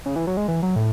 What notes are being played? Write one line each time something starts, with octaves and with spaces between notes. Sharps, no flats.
C#3
E3
F#3
G#3
E3
F#3
A2